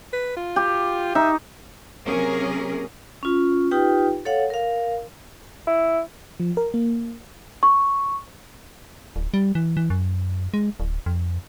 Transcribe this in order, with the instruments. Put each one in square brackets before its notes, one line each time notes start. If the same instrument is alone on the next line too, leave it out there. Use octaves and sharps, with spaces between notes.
[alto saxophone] B4
F4
[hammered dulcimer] G4
[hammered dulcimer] D#4 [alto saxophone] E5
[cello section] C3 F#3 A#3 C#4 G#4 A#4
[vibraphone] C#4 F4
D#4 F4 G4 B4 G5
A4 C#5 F5 F#5
A#4 F5
[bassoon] E4
[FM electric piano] F3
A#4
A#3
[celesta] C#6
[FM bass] D1
G3
E3
E3
F#2
G#3
D1
F2